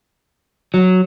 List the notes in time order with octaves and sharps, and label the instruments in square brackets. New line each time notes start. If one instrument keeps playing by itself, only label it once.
[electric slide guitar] F#3